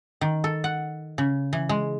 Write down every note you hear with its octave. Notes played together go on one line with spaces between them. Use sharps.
D#3
A4
F#5
C#3
E3
G#3